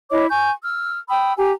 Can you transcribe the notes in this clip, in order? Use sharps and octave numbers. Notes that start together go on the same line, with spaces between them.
E4 C#5 D#5 D6
G#5 C#6 G6
E6 F6
G5 B5 D#6 E6
G4 G#5 A#5